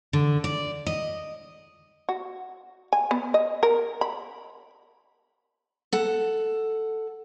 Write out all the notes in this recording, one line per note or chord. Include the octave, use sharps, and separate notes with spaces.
D3
D5
D#5
F#4
G#5
B3
D#5
A#4
B5
A4 F#5